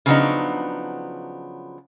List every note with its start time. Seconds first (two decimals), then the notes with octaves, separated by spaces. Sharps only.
0.06 C#3 F3 F#3 B3 D4 D#4